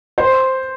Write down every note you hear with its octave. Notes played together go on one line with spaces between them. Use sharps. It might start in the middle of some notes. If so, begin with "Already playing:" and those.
C5